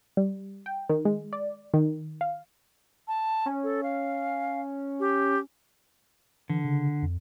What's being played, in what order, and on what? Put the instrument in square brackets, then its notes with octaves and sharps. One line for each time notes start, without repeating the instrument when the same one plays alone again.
[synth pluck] G3
G5
D#3
G#3
D5
D#3
F5
[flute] A5
[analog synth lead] C#4
[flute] A4
F5
G4
[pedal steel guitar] D3 [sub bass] E3
[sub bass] C#3
F2